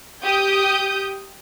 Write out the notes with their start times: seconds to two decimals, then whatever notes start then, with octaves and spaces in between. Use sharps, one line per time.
0.24 G4 D#6 G6